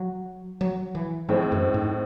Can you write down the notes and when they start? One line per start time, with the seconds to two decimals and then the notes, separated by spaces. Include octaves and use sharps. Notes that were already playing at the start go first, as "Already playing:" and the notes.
Already playing: F#3
0.61 F#3
0.95 E3
1.29 A2 E3 G#3 C4
1.52 F#2
1.74 G#2